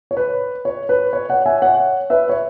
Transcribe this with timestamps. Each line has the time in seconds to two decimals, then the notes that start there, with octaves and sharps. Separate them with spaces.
0.11 C#5
0.17 B4
0.65 C#5
0.89 B4
1.13 C#5
1.30 C#5 F#5
1.46 E5 G#5
1.62 C#5 F#5
2.10 B4 E5
2.29 C#5